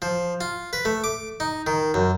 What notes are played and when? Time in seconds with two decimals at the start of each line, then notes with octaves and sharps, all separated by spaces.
0.02 F3
0.41 F4
0.73 B4
0.85 A3
1.04 D6
1.40 D#4
1.67 D#3
1.94 F#2